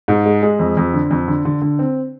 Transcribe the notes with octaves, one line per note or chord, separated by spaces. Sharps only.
G#2
G#3
G#3
F2
F2
D3
F2
D3
D3
D3
C4